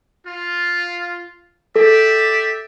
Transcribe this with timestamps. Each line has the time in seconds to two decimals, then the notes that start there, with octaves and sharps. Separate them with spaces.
0.24 F4
1.76 G4 A4 D5 E5